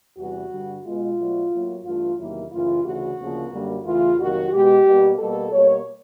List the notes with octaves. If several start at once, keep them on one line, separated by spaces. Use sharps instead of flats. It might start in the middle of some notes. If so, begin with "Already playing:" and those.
E2 C3 E3 G3 F#4
G2 D3 G3
B2 G#3 F4
B2 F#3 A3
A2 F#3 A#3
G2 E3 A3 F4
E2 C3 D#3 F#3 A#3 E4
F#2 C#3 E3 A3 F4
D2 C#3 E3 A3 F#4
D2 C#3 F3 A#3
F#2 D3 G3 A#3
E2 C#3 E3 A3 F4
F2 C3 D#3 F#3 A#3 F#4
B2 G#3 G4
B2 G3 A#3
B2 G3 A#3 A4
B2 G3 A#3 C#5